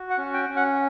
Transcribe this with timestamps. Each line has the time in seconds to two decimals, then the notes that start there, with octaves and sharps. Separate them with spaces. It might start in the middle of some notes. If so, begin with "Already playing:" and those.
Already playing: F#4
0.10 F#5
0.18 C#4
0.34 G5
0.49 C#4
0.57 F#5